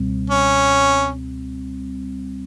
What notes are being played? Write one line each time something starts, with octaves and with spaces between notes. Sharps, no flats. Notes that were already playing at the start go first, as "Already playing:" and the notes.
Already playing: C#2 B2 G3 C4
C#4